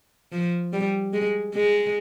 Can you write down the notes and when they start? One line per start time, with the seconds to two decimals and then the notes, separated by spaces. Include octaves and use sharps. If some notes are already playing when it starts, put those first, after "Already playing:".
0.32 F3
0.73 G3
1.13 G#3
1.55 G#3